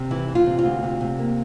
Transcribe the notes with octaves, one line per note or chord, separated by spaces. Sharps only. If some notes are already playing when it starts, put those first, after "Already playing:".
Already playing: C3
E3 E4
E3
F4
C3
F4
D2
C3
C3
A#3